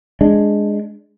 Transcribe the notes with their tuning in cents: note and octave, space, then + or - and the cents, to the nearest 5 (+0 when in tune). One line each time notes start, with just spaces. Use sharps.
G#3 +0 D4 +0